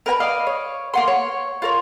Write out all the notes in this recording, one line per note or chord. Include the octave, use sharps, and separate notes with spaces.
A#4 B4 G#5 A#5
D5 D#5 F5
C#5
A#3 F#5 C6
C#5
F4 A#4 C#5